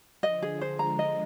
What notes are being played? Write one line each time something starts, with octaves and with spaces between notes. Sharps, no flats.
D3 F3 D#5
G#4
C5
F3 G#3 A#5
D#5